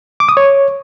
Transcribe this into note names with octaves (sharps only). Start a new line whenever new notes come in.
D6
D#6
C#5